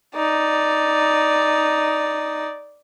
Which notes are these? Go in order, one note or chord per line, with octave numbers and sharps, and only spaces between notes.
D#4 D5